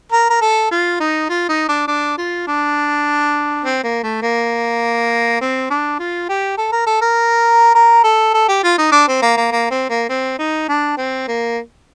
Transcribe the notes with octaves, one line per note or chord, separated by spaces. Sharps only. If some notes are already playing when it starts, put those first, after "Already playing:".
A#4
A#4
A4
F4
D#4
F4
D#4
D4
D4
F4
D4
C4
A#3
A3
A#3
C4
D4
F4
G4
A4
A#4
A4
A#4
A#4
A4
A4
G4
F4
D#4
D4
C4
A#3
A#3
A#3
C4
A#3
C4
D#4
D4
C4
A#3